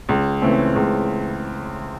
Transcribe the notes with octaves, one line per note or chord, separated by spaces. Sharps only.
C#2
C#3 E3 A3 C4
C#2